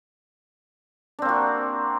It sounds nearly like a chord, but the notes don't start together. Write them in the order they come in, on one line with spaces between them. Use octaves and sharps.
D4 C4 A#3 F#4